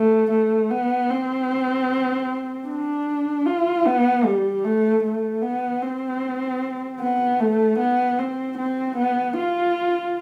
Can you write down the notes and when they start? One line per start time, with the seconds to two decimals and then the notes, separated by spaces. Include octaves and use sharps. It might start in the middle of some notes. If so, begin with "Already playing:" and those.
Already playing: A3
0.31 A3
0.70 B3
1.10 C4
2.68 D4
3.46 F4
3.86 B3
4.25 G3
4.64 A3
5.04 A3
5.42 B3
5.82 C4
7.00 B3
7.40 A3
7.79 B3
8.19 C4
8.58 C4
8.97 B3
9.37 F4